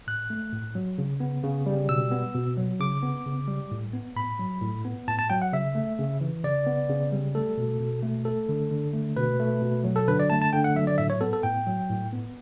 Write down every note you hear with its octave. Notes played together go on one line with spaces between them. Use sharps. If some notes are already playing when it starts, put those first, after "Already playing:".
A2 F#6
A3
A2
F#3
C#3
B3
C#3
G3
B2 E6
B3
B2
F#3
C#3 D6
B3
C#3
G3
A2
B3
A2 B5
F#3
A2
B3
A2 A5
A5
F#3 G5
F#5
C#3 E5
A3
C#3
E3
C#3 D5
B3
C#3
G3
A3 A4
B2
B2
A3
A3 A4
D3
D3
A3
B2 B4
A3
B2
F#3
A4
D3 B4
D5
A3 A5
A5
D3 G5
F#5
F#3 E5
D5
A2 E5
C#5
B3 A4
A4
A2 G5
F#3
A2
B3